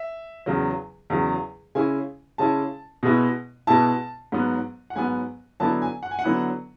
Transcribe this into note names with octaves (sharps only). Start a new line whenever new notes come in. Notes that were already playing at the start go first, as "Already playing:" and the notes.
Already playing: E5
E2 C#3 F#3
E2 C#3 F#3
C#3 G#3 C#4 E4 G#5
C#3 G#3 C#4 E4 A5
B2 G#3 B3 E4
B2 G#3 B3 E4 A5
G#2 F#3 B3
F#5
G#2 F#3 B3 G#5
D3 F#3 B3 E4 A5
G#5
F#5
G#5
F#5
D3 F#3 B3 E4